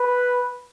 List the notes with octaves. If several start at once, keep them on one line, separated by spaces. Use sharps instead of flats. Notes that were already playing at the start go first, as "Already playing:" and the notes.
Already playing: B4